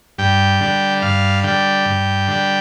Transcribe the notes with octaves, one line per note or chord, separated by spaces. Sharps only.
G2 G5
D3 G3
G2 F5
D3 G3 G5
G2
D3 G3